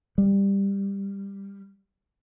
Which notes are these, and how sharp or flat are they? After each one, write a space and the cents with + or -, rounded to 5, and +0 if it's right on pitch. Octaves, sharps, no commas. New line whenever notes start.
G3 +15